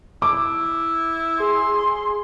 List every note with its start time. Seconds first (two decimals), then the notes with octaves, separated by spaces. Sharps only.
0.22 E4 D6
1.40 G#4 C6